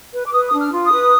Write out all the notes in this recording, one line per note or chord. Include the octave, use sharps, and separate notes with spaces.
B4
D6
B4 D#6
D4 D#6
F6
F4
D#6
B4